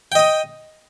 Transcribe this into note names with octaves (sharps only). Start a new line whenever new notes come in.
D#5 G5 D#6